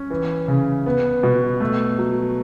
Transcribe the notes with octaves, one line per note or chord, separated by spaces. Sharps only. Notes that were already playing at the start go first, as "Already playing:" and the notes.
Already playing: C#4
E3
C#3
B3
B2
A3
F#3